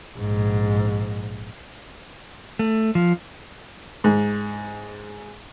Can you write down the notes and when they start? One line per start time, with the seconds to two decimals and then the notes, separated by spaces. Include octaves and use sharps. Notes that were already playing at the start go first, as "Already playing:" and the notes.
0.19 A#1 G#2
2.59 A3
2.95 F3
4.04 G#2